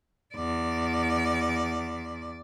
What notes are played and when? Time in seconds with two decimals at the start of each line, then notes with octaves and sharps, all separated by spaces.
0.34 E2 D5